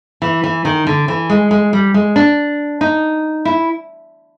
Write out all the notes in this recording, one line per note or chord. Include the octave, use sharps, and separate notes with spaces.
E3
E3
D#3
D3
E3
G#3
G#3
G3
G#3
D4
D#4
E4